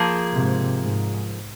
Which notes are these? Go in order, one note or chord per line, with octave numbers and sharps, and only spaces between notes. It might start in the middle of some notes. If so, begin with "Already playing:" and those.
Already playing: F3 A#3 G#4
G#2 C3
G#2